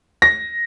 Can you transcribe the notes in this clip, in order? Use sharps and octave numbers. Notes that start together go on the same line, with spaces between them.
A#6